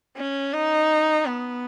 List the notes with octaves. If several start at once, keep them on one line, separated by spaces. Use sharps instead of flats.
C#4
D#4
B3